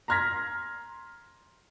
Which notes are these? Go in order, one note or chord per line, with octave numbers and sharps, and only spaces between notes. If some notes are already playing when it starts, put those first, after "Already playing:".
A#5 C6 F6 G#6 A#6 B6